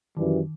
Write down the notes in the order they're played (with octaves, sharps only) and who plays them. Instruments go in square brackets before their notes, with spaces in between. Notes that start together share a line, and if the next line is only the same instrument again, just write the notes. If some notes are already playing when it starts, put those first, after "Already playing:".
[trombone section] F#2 E3 G3 [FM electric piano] D#3